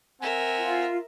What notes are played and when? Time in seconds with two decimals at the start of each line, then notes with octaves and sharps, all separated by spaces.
0.22 C4 A#4 E5 F#5 G#5
0.59 F4